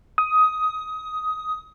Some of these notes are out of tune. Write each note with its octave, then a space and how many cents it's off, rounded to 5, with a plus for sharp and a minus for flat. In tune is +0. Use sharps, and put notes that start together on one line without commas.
D#6 +15